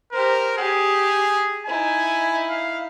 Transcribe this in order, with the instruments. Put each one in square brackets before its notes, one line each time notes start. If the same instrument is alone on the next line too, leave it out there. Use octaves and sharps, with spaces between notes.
[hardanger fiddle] G4 C5 [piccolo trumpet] A#4
[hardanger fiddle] G4 [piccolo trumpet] G#4
[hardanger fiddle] D#4 E4 [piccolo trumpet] G#5
[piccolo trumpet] F5